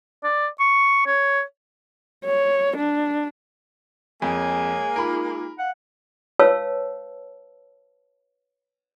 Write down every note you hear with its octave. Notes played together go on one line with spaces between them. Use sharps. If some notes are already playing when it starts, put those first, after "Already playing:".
D5
C#6
C#5
C#5
D4
F2 G#3 A#3 G#4 C#5 G#5
D#4 F4 A#4 B5 D6
F5 F#5
B4 C#5 F5 A5 E6